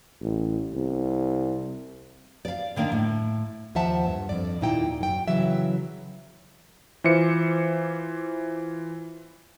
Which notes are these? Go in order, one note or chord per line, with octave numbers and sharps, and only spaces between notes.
A1
C2
D5 F5
D3 D#3 A#3 D4
A2
D#2 F3 C5 E5 F#5 A5
G2
F2 D5
D#2 A#2 D#4 E4 G5
F#2 G5
C#3 E3 F#3 E5
E3 F4 C5 E5 D6 C#7